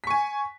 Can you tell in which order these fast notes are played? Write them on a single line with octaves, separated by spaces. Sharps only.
B6 C#6 G#5